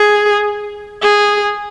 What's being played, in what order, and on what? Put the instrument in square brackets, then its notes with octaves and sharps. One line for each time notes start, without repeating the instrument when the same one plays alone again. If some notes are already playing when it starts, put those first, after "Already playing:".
Already playing: [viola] G#4
G#4